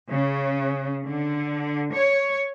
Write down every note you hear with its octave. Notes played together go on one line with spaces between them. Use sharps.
C#3
D3
C#5